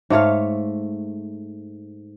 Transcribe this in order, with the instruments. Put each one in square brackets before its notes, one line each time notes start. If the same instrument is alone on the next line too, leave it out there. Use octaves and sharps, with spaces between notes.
[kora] G#2 A3 C#5 F5